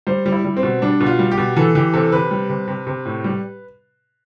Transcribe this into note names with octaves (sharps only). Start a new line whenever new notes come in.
G3 C5
G3
E4
G3
C4
B2
G3 D4
B2
F4
G3
G4
B2
E3 A4
E3 G4
C3 A4
C3 B4
G3
C3
C3
C3
A2
G3